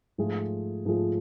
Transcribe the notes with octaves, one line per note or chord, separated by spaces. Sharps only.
G#2 F3 A3 F4 G#4
G#2 F3 A3 F4 G#4